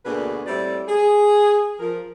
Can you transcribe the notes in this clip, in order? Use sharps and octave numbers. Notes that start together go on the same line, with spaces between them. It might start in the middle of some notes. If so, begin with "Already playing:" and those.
D2 B2 A#3 D4 G#4 B4
A2 G3 C4 E4 G4 D5
G#4
F3 A#4